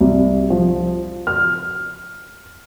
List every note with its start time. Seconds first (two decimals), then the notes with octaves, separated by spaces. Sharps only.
0.01 C2
0.50 F3
1.27 F6